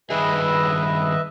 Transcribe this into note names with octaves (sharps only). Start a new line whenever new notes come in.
G2 D#3 G#4 B4 D#5 E5